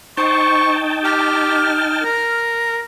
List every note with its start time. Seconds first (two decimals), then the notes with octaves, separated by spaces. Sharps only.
0.17 D#4 C5 G5 A5 C#6
1.04 G4 F6
2.03 A#4